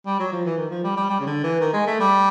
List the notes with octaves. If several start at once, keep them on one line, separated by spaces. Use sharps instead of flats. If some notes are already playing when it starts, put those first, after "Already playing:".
G3
F#3
F3
E3
D#3
F3
G3
G3
G3
C#3
D3
E3
D#3
G#3
A3
G3